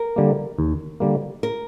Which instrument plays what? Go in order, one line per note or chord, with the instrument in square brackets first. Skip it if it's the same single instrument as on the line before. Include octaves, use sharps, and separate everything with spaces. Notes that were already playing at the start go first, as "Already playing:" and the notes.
Already playing: [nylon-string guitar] A#4
[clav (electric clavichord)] D3 G3 A#3
D#2
D3 G3 A#3
[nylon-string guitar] A#4